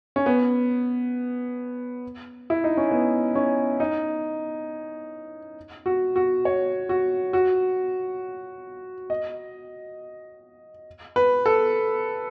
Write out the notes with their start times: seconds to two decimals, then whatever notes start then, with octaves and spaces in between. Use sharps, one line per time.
0.16 C#4
0.26 B3
2.50 E4
2.64 D#4
2.77 C#4
2.91 B3
3.35 C#4
3.80 D#4
5.86 F#4
6.16 F#4
6.45 C#5
6.89 F#4
7.33 F#4
9.10 D#5
11.16 B4
11.46 A4